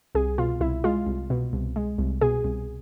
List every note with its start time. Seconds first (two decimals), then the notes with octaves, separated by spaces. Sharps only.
0.15 C2 G#4
0.38 B2 F4
0.61 C2 E4
0.84 G#3 F4
1.07 C2
1.30 B2
1.53 C2
1.76 G#3
1.98 C2
2.21 B2 G#4
2.44 C2